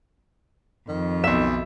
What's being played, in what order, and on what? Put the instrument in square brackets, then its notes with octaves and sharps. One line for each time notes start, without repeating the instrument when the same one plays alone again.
[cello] F2 [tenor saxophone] D#3
[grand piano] B1 E7 [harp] E5